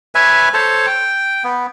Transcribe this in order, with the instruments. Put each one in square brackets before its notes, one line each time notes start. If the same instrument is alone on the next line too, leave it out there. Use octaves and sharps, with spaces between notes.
[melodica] B4 C#5 E5 G#5
A4 C5 C#5 A5
G5
B3